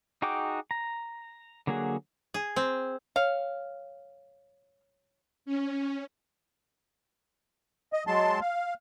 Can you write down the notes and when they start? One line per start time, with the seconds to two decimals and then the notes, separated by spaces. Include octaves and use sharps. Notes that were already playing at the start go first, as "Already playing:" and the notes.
0.22 D#4 F#4 G#4 G5 D6
0.71 A#5
1.67 D3 F#3 A#3 F#4 G#4
2.34 G#4
2.56 C4
3.16 C#5 F5 F6
5.46 C#4
7.93 D#5
8.07 F#3 G#3 A5 C6
8.41 F5